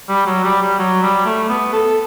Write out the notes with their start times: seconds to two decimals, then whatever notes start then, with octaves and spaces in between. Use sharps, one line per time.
0.09 G3
0.26 F#3
0.44 G3
0.62 G3
0.79 F#3
1.03 G3
1.26 A3
1.49 B3
1.73 A4